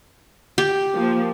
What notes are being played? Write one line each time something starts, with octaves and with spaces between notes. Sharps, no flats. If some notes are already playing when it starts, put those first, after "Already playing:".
G4
F3 A#3